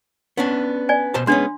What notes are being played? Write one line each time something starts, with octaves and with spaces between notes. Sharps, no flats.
B3 C#4 D4
D5 G#5
B2 C5 A5
G#3 B3 C#4 D4 C6